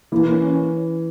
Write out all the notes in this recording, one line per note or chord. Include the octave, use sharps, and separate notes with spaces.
E3 A#3
C#4